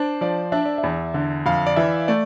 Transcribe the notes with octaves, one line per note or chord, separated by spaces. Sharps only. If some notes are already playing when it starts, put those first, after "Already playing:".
Already playing: D4 C5 D5
F3 D5
D4 E5
D5
E5
E2
D3
F2 F5
D5
E3 E5
A3 D5